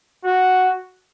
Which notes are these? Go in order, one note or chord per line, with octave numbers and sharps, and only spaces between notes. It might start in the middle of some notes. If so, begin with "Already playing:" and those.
F#4